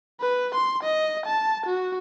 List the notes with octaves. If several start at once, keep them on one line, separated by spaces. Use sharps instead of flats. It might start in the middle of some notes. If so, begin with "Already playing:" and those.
B4
C6
D#5
A5
F#4